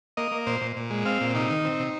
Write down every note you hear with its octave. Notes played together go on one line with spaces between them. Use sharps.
A#3 D#5
A#3
A#2 C5
A#2
A#2
G#3
C4 F5
A#2
C3 D#4
D#3
C4
C3